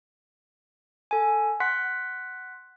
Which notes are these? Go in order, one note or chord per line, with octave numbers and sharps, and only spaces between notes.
A4 G#5
F#5 C6 F#6 B6